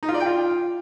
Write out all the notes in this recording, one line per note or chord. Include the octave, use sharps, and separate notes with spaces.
D#4
F4
D5
G5
F4